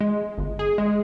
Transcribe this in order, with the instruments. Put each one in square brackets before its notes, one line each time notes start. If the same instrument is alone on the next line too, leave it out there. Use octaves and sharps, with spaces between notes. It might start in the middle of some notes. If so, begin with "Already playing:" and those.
[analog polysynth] G#3
G1
G#4
G#3